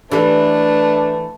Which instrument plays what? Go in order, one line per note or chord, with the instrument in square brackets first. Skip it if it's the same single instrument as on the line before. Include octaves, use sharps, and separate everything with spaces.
[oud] E3 A4 [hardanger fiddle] A3 [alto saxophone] D4 [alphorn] B4